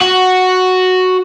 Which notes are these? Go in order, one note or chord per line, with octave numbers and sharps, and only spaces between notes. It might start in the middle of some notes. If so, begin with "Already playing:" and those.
F#4